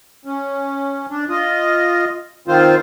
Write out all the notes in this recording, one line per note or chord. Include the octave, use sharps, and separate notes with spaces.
C#4
D4
F4 D#5
D#3 C4 F4 C5